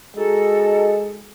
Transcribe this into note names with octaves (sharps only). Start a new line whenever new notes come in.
G#3 D#4 F#4 A4